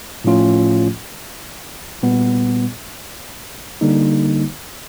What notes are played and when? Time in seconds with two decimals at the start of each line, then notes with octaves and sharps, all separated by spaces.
0.24 A2 F3 A3 C#4 F4
2.03 A#2 G3 B3
3.81 D3 G3 A#3 D#4